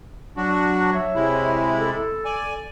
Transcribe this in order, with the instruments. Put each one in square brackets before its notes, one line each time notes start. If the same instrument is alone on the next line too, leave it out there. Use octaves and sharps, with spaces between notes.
[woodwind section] F#3 [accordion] D4 F#4
[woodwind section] C#5 E5
[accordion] C3 G#3 E4
[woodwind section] A4
[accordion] D5 G#5